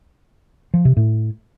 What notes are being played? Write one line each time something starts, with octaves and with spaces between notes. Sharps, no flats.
F3
C3
A2